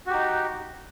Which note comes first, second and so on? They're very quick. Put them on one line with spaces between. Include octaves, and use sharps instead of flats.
F#4 G4 D#4